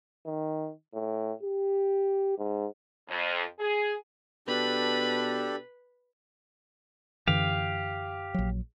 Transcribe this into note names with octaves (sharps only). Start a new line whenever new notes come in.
D#3
A2
G4
G#2
F2
G#4
B2 D4 G4 A4 B4 B5
F#2 D3 E3 G4 F5
A#1 F#3